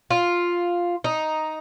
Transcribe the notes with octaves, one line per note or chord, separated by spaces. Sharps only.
F4
D#4